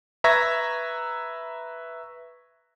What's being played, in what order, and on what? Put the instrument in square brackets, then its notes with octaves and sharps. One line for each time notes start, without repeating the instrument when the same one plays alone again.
[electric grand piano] B4 E5 A#5 C#6 G#6 A#6